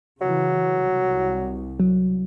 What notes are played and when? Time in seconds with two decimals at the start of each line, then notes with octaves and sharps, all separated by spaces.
0.21 C#3 E3 F#3
0.77 C2
1.80 F#3